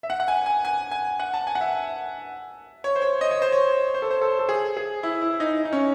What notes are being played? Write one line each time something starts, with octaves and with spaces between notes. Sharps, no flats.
E5
F#5
F#5
G#5
G#5
G#5
G#5
F#5
A5
G#5
F#5
E5
C#5
C5
C#5
D#5
C#5
C5
C#5
C5
A4
C5
A4
A4
G#4
G#4
E4
E4
D#4
D#4
C#4